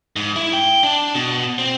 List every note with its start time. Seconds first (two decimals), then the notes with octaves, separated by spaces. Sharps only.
0.16 G#2
0.36 E4
0.53 G5
0.83 D4
1.15 B2
1.59 C4